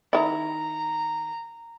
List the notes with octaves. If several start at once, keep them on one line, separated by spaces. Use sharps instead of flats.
D#3 E4 A#5